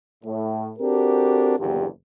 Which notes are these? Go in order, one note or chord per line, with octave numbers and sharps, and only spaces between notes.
A2
C4 D4 F#4 G4 A4 A#4
F#1 E2 A#2 D3 G4